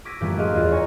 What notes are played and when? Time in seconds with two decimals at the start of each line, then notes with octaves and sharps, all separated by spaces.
0.05 D6 E6 G#6 A#6 B6 D#7
0.20 F#2 A2 E3 F3 G3 A#3
0.36 F#4 G#4 D#5 F5 C6 E6
0.54 E2 F4 G#6 C7
0.71 C#5 G#5 A#5